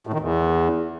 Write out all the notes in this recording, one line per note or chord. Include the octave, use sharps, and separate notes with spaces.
A2
D#3
E2